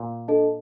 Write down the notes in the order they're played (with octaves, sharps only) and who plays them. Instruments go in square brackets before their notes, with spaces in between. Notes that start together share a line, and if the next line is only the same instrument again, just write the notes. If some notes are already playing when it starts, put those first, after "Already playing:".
Already playing: [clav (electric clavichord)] A#2
[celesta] D4 A4 D#5 A5